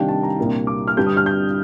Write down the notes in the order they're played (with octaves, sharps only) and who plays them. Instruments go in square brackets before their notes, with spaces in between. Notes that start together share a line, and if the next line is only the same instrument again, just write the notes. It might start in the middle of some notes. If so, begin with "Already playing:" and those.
Already playing: [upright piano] C3 D#3 G3 D4 F5 G5
A5
A#5
C2 A#2 G3 A#3 D4
D6
F6
G2 D3 G3 G6
D#6
F6
G6